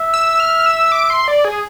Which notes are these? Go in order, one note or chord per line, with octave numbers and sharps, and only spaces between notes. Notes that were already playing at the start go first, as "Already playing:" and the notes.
Already playing: E5
E6
F6
E6
D6
C6
D5
G#4